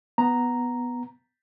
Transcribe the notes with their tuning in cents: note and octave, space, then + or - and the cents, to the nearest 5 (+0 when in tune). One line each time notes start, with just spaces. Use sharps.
B3 +0 A#5 +0